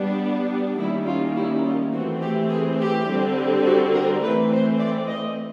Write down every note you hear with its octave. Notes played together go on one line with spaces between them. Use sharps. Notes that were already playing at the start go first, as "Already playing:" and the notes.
Already playing: G3 B3 D4
D#3 G3 A#3 C#4 E4
F4
E4
F4
E3 A3 C4 F#4
G4
G#4
G4
D3 G3 C4
F#4
A#4
E3 A3 C4 B4
C5
D5
D#5